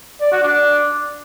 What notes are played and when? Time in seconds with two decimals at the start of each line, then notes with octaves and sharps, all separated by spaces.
0.21 D5
0.32 F#4
0.43 D4